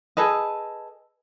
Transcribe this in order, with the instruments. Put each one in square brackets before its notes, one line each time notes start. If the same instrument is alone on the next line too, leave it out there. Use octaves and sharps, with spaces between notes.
[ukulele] G#4 A4 B4 D#5